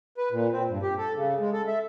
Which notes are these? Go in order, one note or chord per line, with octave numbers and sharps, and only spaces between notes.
B4
A#2
C4
G2
G4
A4
C#3
G#3
A4
E5